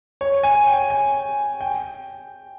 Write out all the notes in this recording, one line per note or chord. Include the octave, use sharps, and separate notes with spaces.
C#5
G#5
G5
G#5
G5